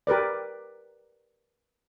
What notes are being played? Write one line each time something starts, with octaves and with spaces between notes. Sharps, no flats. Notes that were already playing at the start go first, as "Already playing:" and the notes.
G4 A#4 B4 D5